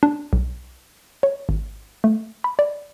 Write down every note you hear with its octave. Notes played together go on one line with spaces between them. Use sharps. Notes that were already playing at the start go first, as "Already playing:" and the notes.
D4
B1
C#5
G#1
A3
B5
D5